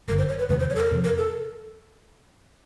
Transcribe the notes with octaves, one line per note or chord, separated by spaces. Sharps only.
G1 F#2 D3 A#4
C5
C#5
B4
E2 C3 D#3 F#3 B4
C5
C#5
A4
A#4
F2 C3 F3
A#4
A4